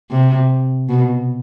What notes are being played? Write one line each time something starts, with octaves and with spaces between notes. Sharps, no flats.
C3
B2